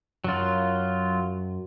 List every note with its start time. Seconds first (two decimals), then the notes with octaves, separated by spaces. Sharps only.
0.24 F#2 F#3 F4